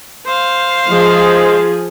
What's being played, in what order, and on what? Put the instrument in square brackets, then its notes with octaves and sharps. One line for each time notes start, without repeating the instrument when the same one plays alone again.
[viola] C5 F5
[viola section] F3 G#4 [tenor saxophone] G#3